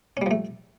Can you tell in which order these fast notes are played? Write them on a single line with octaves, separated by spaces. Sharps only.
C#4 G3 F3 A3